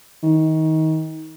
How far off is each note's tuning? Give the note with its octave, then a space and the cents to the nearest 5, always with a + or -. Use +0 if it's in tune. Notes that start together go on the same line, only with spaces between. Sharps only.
D#3 +25